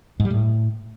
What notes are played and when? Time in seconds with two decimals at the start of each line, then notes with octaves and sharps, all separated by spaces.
0.20 G#2
0.25 G3
0.30 A2